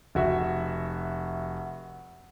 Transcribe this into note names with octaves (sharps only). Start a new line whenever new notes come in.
F1 F#4 E5